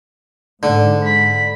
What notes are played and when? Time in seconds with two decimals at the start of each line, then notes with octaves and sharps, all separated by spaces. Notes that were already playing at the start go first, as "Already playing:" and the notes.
0.63 G#2 D3
1.04 B5